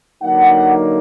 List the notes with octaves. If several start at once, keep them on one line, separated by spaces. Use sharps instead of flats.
D3 F#3 A#3 D#4 F#5